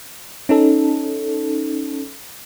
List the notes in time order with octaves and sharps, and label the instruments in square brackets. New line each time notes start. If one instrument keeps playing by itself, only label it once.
[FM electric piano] C#4 D#4 A4